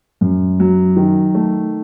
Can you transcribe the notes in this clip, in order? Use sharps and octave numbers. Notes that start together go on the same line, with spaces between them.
F#2
F#3
D#3
A3